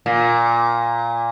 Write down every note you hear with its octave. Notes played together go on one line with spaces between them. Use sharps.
A#2